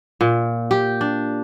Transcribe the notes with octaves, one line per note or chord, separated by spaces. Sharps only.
A#2
G4
D4